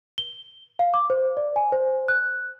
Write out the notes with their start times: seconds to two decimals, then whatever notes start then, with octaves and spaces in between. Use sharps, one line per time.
0.18 G7
0.79 F5
0.94 D6
1.10 C5
1.37 D5
1.56 G#5
1.72 C5
2.08 F#6